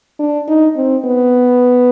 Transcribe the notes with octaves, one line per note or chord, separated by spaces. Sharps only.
D4
D#4
C4
B3